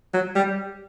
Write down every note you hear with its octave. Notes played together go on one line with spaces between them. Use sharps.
F#3
G3